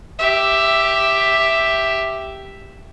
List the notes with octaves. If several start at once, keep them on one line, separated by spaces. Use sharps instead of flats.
G4 E5